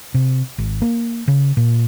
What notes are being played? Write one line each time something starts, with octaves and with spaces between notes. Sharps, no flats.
C3
G#1
A#3
C#3
A#2